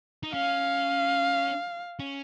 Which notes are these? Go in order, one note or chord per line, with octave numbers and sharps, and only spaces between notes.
D#4
C#4 F5
C#4